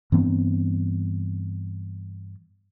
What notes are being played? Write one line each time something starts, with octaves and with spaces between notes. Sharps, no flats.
G2 E3 B3 C4